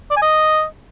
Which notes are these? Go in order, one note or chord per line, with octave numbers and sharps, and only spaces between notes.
D5
G#5
D#5